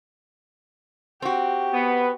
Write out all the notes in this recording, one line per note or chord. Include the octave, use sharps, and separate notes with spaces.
C4 F#4 G4
B3